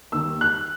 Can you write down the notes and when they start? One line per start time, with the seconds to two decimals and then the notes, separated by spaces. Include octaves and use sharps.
0.12 D#2 D#3 E6
0.41 F#6